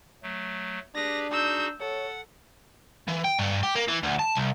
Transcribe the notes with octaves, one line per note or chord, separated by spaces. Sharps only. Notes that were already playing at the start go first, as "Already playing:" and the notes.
F#3 A3
D4 G4 G#4 B4 A#6
D#4 F#4 G#4 E6 G6
A4 C#5 F#5
E3
G5
G2
G4
A#3
E3
D2
A5
C2